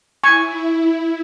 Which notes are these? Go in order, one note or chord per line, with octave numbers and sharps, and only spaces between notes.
E4 G#5 C#6